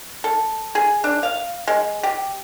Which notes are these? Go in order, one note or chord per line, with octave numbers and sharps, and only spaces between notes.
A4
G#4
D4
F5
G#3
G4